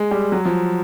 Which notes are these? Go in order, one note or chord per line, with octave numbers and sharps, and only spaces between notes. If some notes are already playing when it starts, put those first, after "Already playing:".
Already playing: G#3
G3
F#3
F3